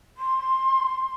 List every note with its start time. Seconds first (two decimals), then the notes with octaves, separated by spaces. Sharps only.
0.17 C6